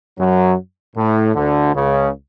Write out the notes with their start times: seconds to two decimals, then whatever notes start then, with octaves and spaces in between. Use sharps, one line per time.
0.18 F#2 F#3
0.96 A2
1.35 D2 D3
1.74 C#2 C#3